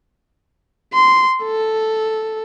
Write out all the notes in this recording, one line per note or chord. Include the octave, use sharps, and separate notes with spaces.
C6
A4